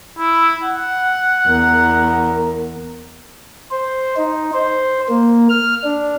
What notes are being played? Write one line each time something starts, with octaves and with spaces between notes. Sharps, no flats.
E4
F#5
E2 A#4
C5
D#4
C5
A#3
F6
D4